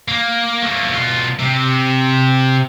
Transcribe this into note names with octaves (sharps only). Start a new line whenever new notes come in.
A#3
A3 A#3
B2 F4
C3